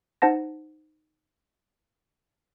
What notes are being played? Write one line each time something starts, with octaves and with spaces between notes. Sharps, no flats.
D#4 C5 F#5 A5 A#6